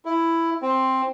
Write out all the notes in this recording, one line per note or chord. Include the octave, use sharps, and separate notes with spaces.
E4
C4